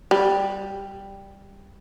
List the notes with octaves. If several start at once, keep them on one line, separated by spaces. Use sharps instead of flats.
G3